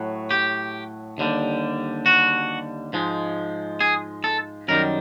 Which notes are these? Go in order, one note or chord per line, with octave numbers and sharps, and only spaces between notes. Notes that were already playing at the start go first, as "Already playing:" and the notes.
Already playing: A2 F#3
G4
D#2 D3 G3
F#4
G#2 F3 G#3
G#4
A4
F#2 D#3 G3 A#4